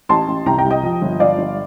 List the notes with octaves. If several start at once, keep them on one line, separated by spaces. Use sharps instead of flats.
A1 A5 C6
A1
C2 G5 A#5
G5 A#5
C2
D#5 G5
F3
G1
F3 D5 F5
G1